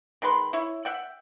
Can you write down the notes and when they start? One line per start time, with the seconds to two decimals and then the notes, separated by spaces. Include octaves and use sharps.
0.22 D#3 G#3 B4 C6
0.53 E4 C#5
0.85 E5 F#5 G5